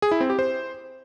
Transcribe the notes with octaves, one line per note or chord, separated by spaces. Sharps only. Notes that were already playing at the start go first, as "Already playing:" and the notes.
G#4
E4
C4
G4
C5